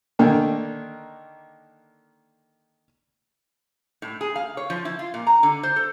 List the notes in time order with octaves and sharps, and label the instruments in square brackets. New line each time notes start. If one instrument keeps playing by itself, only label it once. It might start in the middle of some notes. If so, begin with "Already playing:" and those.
[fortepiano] D3 D#3 A#3 D4
[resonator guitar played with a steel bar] A2
G#4
F5
C#5
F3
E4
F4
A#2
A#5
D3
C5
A4